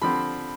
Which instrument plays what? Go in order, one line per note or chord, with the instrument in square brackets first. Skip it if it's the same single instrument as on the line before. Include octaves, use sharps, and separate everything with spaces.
[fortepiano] D3 F3 C4 [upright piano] B5